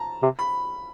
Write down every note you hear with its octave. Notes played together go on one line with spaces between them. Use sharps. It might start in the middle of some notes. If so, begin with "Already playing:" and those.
Already playing: A5 A#5
C3
B5